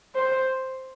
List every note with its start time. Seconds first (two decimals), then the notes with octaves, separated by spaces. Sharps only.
0.15 C5